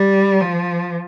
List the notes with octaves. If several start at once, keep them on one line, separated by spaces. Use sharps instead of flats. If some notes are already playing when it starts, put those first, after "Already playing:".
Already playing: G3
F3